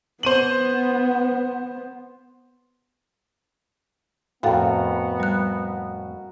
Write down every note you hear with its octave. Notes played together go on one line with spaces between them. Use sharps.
B3 C5 D#7 F#7
F2 A2 B3 F#4 A4 A#4 F5 G5
G3 F#6